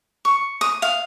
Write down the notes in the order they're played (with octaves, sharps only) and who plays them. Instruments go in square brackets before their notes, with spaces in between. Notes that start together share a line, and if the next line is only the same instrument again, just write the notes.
[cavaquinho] C#6
D#6
F5